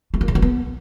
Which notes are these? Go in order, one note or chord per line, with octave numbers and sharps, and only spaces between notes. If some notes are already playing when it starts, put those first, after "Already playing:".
A3
A#3
C#3
A#3
B3